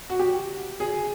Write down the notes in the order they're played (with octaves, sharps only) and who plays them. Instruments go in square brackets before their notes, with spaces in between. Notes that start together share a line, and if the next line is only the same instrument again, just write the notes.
[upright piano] F#4
G4
G#4